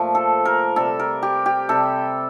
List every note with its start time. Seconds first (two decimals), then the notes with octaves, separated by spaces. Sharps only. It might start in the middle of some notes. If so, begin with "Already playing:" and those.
Already playing: A#2 F3 A3
0.15 A4
0.45 A#4
0.76 C3 G3 A4
1.00 A#4
1.23 G4
1.46 G4
1.69 C3 G3 A4